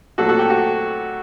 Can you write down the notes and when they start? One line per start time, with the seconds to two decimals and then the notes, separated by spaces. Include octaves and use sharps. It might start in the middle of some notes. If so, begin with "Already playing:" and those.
0.18 A#2 F#3 A3 C4 F#4 A4
0.29 F#4 A4
0.39 G4
0.50 F#4